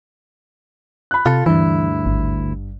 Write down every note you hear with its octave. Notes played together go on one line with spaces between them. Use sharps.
B5 F#6
C3 F4 A4
D2 G2 E3 E4
G#1